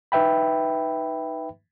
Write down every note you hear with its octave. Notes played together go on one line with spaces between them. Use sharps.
D#4 B4 E5 G5 B5